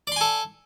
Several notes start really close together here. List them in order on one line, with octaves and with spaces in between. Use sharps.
D5 C6 G#5 A4